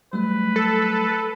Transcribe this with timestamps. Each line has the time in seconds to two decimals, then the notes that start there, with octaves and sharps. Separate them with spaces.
0.13 F#3 G3 A3 B4
0.56 A4